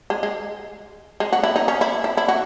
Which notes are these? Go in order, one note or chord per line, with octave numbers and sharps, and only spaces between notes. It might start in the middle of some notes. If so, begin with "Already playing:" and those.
G#3
G#3
G#3
F#4
E4
D#4
C#4
E4
E4
E4
F#4